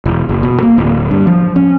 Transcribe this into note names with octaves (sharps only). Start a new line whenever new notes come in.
E1
F#1
B2
A#3
D1
G2
F3
C#4